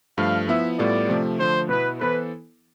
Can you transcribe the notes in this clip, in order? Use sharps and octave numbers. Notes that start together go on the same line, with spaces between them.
G2 F3 A3 F5
F3 B3 E4 E5
A2 G3 B3 F4 A4 D5
C3 F3 A3
D3 F3 A3 C5
B2 B3 E4 B4
E3 B3 E4 A4 B4 C5